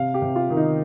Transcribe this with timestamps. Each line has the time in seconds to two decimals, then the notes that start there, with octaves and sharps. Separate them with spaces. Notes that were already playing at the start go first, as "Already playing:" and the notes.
Already playing: C3 F5
0.14 G4
0.22 C3
0.36 F4
0.50 D#3
0.57 D#4